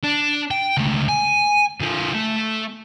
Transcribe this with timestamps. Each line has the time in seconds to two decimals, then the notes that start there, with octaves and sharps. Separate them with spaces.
0.04 D4
0.51 G5
0.77 C#2 A3
1.09 G#5
1.80 D3 F3
2.14 A3